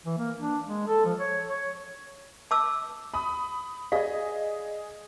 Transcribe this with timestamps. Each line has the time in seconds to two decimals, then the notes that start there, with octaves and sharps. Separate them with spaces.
0.06 E3
0.18 A#3
0.39 D4
0.65 G#3
0.87 A4
1.05 F3
1.19 C#5
1.48 C#5
2.51 A5 D6 E6
3.14 B5 D#6
3.92 G#4 D5 D#5 F5